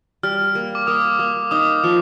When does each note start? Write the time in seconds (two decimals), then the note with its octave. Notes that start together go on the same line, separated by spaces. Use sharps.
0.23 G3 F6
0.55 A#3
0.75 D6
0.87 A#3 D#6
1.19 A#3
1.51 D#4 D#6
1.84 F3